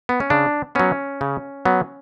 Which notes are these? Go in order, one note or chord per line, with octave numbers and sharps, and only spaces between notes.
B3
C#4
C#3 D4
F#3 B3 C#4
C#3
F#3 B3